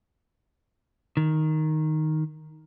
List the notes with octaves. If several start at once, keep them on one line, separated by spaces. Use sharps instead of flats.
D#3